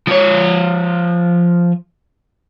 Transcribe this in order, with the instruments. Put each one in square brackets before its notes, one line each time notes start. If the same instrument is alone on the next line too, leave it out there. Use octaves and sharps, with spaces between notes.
[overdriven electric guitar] F3 C#5